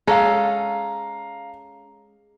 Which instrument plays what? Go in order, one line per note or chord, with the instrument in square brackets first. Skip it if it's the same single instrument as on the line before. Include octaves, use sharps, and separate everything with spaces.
[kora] G#3 C#4 A4 [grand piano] F5 A#5